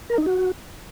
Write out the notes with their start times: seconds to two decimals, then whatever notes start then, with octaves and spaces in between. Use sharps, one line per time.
0.10 A#4
0.18 D#4
0.26 F#4